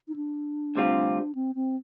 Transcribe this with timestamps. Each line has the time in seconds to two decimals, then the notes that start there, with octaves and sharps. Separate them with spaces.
0.08 D#4
0.16 D4
0.75 D2 C3 G3 C4 F4
1.35 C4
1.55 C4